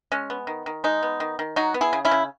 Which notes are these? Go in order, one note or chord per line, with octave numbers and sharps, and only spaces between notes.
G#3 C#4
B3
D#3
D#3
G#3 D#4
B3
D#3
D#3
F#3 D#4 F#4
B3
E4 G#4
C#3
C#4 E4
C#3